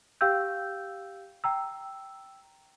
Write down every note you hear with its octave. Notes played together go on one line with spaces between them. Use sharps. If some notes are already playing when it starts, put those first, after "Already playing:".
G4 F5 G5 E6 G6
G5 A#5 E6